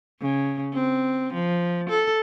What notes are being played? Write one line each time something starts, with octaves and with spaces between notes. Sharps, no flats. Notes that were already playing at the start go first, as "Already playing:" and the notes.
C#3
C4
F3
A4